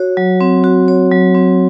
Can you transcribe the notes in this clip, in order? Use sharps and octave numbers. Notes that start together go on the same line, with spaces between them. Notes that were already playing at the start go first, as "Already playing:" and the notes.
Already playing: F#4 C#5
F#3
C4
F#4
C#5
F#3
C4